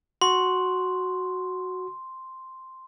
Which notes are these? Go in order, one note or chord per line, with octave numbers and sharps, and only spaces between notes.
F#4 C6